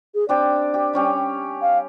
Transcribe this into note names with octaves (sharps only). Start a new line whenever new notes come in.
G#4
C4 D4 G4 D5
G4
G3 C#4 G4
F5